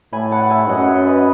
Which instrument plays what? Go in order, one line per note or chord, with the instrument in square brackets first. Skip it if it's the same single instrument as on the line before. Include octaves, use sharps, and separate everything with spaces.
[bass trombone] A2 [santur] G#5 B5
[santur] F#5 A5
F#5
E5 G#5
[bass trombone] F#2 [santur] D#5 F#5
[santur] F#5
C#5 E5
B4 D#5